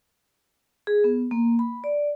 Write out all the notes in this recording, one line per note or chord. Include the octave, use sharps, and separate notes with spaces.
G#4
B3
A#3
B5
D5